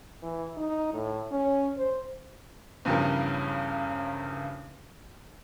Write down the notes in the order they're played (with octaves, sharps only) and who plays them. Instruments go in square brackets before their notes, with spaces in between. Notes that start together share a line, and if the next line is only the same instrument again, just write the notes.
[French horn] E3
D#4
A2
C#4
C5
[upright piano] E2 G2 C#3 F3 G4 A#4